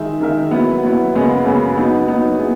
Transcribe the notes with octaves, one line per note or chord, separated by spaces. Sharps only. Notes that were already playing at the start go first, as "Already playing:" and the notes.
Already playing: D#3 G#3 D#4 A#4 E5
D#3 G#3 D#4 A#4 E5
F#3 B3 E4
F#3 B3 E4
F#2 C#3 G#3 B3
F#2 C#3 G#3 B3
F#3 B3 D#4
F#3 B3 D#4
B3 E4 G#4